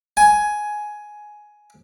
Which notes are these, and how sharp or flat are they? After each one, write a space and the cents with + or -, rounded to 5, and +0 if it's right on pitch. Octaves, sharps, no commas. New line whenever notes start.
G#5 +10